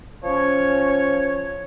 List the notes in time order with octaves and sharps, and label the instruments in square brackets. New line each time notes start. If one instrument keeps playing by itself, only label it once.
[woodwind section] F3 C#4 C#5